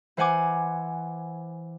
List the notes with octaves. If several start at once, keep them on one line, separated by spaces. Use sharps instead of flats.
E3 C5 F#5 G#5 D6